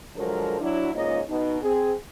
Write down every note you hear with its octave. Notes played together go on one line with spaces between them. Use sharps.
D3 F3 F#3 G#3 A4 A#4
F#3 D4 E4
G#2 C#3 A#3 F4 C#5 D#5
B2 D#4
C4 G#4